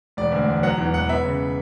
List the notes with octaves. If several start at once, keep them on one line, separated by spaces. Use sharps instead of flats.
E1 D5
D2
E1
F#3 F#5
E2
E1 F#5
B3 E5
C#3